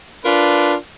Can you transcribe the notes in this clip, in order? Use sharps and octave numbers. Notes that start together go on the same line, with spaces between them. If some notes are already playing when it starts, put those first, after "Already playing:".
D4 F4 A#4 B4